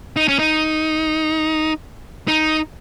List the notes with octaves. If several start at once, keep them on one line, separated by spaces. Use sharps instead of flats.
D#4
C#4
D#4
D#4